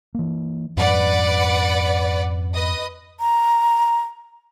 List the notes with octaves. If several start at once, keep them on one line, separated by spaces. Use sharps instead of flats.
E3 A#3
F2 G#2 B4 D5 F#5
B4 D#5 D#6
A#5